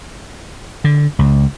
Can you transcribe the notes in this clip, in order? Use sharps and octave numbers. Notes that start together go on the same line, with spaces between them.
D3
C#2